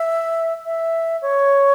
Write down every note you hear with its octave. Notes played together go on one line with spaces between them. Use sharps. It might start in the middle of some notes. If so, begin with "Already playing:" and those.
Already playing: E5
E5
C#5